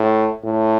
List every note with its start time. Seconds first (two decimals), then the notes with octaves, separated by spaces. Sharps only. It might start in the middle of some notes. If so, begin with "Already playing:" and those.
Already playing: A2
0.44 A2